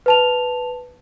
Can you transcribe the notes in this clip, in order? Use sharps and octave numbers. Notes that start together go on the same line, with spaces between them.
B4 A5 F7